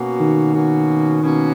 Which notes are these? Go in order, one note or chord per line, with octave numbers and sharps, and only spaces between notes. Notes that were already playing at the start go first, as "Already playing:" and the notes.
Already playing: B2 A#3 C#4 F#4
D#3
B2 A#3 C#4 F#4
B2 A#3 C#4 F#4